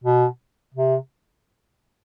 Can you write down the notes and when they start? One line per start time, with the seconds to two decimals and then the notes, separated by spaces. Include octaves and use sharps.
0.04 B2
0.74 C3